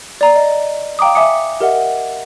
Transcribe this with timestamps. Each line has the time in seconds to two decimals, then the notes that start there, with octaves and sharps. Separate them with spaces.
0.21 D5 A#5
0.36 D#5
0.99 F5 G5 A#5 D6 D#6
1.15 E5 G#5 D6 D#6 C#7
1.60 G4 A#4 D#5 E5 F#5